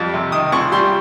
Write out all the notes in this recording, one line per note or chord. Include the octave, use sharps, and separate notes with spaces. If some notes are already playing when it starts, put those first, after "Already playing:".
Already playing: F2 G3
C3
D#3 D#6
C#2 C#6
G3 C6